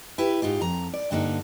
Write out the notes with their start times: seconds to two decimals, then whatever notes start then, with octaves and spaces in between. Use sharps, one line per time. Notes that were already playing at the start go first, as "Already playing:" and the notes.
0.18 E4 G4 B4
0.42 G#2 D#4 F4 G4
0.61 F2 A#5
0.94 D5
1.11 G2 D3 A#3 D#4